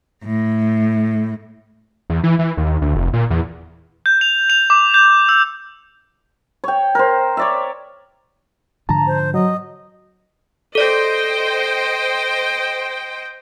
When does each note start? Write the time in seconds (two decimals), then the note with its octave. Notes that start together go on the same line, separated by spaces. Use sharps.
0.23 A2
2.10 E2
2.24 E3
2.39 E3
2.57 D#2
2.82 D2
2.95 F1
3.13 A#2
3.31 E2
4.06 G6
4.21 F7
4.50 F7
4.70 D6
4.94 G6
5.29 E6
6.64 C#5 G5
6.95 A#4 C5
7.37 C#5 D5 E5
8.89 G#2 D3 F3 A5 A#5
9.07 C5
9.34 F#3 D#5
10.75 A4 C5 D5 D#5 G5